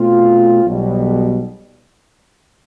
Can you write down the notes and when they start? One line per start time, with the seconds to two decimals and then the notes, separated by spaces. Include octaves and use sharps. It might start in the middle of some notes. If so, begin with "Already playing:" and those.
Already playing: B2 A3 C4 F4
0.65 B1 B2 G3